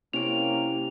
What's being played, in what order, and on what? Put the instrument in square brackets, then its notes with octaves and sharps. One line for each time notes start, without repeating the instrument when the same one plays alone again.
[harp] C3 C#4 [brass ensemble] A#3 [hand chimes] E4 C#5 D7 [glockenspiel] F7